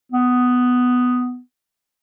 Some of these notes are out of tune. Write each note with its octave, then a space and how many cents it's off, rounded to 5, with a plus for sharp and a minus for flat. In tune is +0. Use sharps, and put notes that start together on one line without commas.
B3 +10